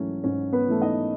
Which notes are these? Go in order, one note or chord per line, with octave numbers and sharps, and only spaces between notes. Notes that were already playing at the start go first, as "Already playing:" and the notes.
Already playing: G#2 E3 F#3 A3 C#4 F#4
G#2 C#4
B3 B4
E3 A3
D#4 D#5